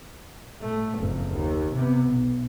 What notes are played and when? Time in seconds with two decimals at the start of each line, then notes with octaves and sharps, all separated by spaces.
0.60 A2 A3
0.99 F#1 F2
1.32 D#2
1.74 C3 B3
2.09 B1